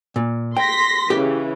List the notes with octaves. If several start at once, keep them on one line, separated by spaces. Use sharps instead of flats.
A#2
G5 C6 A#6 B6
C#3 E3 G4